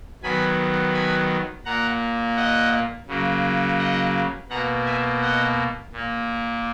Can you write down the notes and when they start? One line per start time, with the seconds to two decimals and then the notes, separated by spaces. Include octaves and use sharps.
0.23 D#3 F#3 B3 G#5 B5
0.94 G#5 B5
1.65 A#2 A#3 F#5 A#5
2.36 D#5 F#5
3.08 C#3 F#3 A#3
3.79 D#5 F#5
4.50 B2 A#3 F#5 A#5
4.86 E5 G#5
5.21 D#5 F#5
5.93 A#2 A#3